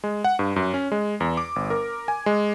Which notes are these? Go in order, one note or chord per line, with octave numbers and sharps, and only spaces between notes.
G#3
F#5
G2
F#2
C#4
G#3
E2
D6
G1
A#4
G#5
G#3